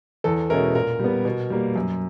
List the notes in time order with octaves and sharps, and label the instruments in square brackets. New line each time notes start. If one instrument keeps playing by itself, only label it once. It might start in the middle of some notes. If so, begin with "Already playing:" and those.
[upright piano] E2 A4
B2 G#3 C#4 E4 A#4
A#2 A#4
G3 B3
B2
G3 A#3
F#2